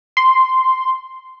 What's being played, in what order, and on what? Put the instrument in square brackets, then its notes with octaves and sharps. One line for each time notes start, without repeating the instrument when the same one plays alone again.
[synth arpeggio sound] C6